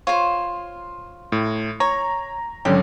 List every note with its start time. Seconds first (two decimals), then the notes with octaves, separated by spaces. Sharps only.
0.07 F4 C5 C#5
1.32 A2
1.80 C#5 A#5
2.65 G#1 D3 F#3 C#4 G4 C#5